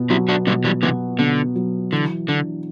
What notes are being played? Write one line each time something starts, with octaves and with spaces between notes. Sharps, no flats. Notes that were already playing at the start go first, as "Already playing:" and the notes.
Already playing: B2 B3
F#3 C4 E4
D4 F#4
B2 G3 B3
E3 G3
C3 E3 B3
B2 D3
F#3
D3 E3
D3 D4